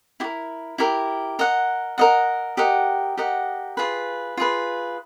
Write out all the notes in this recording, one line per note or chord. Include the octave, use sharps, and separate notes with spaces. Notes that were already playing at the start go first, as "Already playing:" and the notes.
E4 G4 A#4
E4 G4 A#4
A#4 D#5 F#5
A#4 D#5 F#5
G4 A#4 D#5 F#5
G4 A#4 D#5 F#5
F4 G#4 B4
F4 G#4 B4